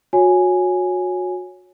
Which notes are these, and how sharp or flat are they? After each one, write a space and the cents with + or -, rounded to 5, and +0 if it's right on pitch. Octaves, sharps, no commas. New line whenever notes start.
F#4 -30 C#5 +0 G#5 +0